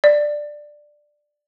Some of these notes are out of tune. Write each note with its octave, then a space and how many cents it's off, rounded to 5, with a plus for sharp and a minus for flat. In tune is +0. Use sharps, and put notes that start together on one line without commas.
D5 +10